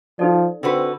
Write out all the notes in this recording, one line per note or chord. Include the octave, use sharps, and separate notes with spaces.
F3 D#4 A4 D5
D3 C4 F#4 B4